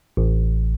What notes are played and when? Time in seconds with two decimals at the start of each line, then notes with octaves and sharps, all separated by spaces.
0.17 A1